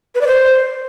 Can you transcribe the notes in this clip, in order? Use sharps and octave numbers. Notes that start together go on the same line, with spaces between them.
B4
D5
C5